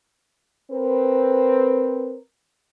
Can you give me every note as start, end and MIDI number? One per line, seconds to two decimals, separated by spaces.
0.71 2.17 60
0.71 2.17 70
0.71 2.17 71